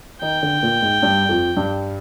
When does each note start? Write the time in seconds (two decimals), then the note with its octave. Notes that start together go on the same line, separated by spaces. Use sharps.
0.21 D#3 D#4 G5
0.42 D3 D4
0.63 A#2 A#3
0.82 G#2 G#3
1.02 G2 G3
1.29 F2 F3
1.57 G2 G3